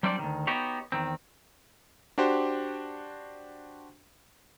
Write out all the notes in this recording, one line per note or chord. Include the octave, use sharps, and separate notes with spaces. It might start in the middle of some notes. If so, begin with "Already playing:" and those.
F#3 G3 C4 D4 C5 D5
D2 D#3
B3 D#4 F#4 G4 C#5
E2 D#3 C4
D4 F#4 G4 C5